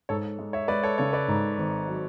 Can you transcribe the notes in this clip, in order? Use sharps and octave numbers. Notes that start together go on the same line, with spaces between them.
G#2 A4 C#5
G#3
C#5 E5
G#3 B4 D5
A4 C#5
C#3 A4 C#5
B4 D5
G#2
G#1
F#3